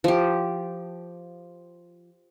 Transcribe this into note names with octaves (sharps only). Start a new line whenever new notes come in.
F3 G4